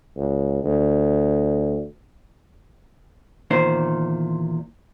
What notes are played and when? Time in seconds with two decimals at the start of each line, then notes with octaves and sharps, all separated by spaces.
0.17 C#2
0.64 D2
3.51 E2 A#2 D#3 C5